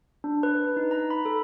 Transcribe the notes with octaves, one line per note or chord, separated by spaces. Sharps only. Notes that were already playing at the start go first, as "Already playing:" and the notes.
D4
B4
B4
D#4
A#5
B5
A4